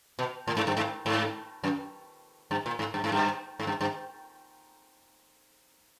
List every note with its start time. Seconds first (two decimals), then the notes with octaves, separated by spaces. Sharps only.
0.19 B2
0.47 A2
0.57 G#2
0.67 G2
0.77 G#2
1.06 G#2
1.63 F#2
2.51 G2
2.66 A#2
2.79 G#2
2.94 G2
3.04 G#2
3.12 G2
3.60 G#2
3.67 G2
3.81 G2